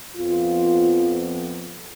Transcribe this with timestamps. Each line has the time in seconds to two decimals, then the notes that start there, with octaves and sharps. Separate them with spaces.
0.15 F2 F3 B3 F4